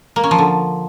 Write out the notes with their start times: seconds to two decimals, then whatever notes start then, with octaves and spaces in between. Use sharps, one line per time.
0.16 A#3
0.24 C#4
0.31 F3
0.38 D3